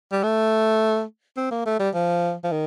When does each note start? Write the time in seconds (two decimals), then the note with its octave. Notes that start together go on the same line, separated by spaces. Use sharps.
0.12 G3
0.23 A3
1.37 C4
1.51 A#3
1.66 A3
1.79 G3
1.94 F3
2.44 F3
2.52 D#3